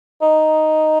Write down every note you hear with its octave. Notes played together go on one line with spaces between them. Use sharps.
D#4